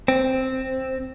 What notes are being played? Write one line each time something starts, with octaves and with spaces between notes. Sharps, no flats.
C4